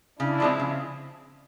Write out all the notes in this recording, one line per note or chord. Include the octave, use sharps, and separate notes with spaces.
C#3 D4 E4
F3 G#3 C4
C#3